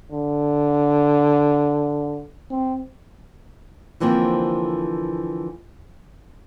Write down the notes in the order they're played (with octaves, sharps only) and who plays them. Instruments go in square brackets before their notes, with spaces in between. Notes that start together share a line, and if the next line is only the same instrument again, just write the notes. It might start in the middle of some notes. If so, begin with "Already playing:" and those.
[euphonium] D3
C4
[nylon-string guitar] D3 E3 F3 A#3 C4